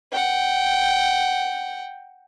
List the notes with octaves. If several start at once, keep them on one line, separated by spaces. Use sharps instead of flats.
F#5 G5